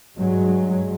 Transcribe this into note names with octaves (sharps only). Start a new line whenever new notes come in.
G2 F#3 G#3